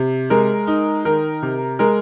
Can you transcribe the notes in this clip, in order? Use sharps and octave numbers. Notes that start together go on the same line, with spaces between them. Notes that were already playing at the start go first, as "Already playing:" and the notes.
Already playing: C3
G#3 A#4
D#4
D#3 A#4
C3
G#3 A#4